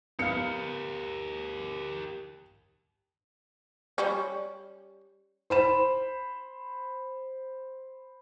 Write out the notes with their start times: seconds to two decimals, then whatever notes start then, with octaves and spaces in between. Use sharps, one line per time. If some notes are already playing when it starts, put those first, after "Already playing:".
0.19 B3 G4 A#4 F5 C#7
3.98 G3 C#4
5.50 C5 B5 E7